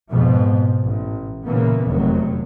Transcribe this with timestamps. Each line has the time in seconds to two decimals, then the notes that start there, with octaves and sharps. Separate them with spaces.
0.10 F2 G#2 B2 F3
0.83 A1
1.45 A#2 C#3 E3 A#3 B3
1.88 F1 E2 D#3 F#3